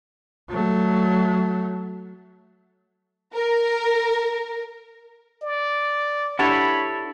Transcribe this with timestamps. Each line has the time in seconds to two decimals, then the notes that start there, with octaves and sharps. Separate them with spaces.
0.49 F#3 A3
3.35 A#4
5.43 D5
6.39 D4 E4 G4 A4 C#5 F#5 B5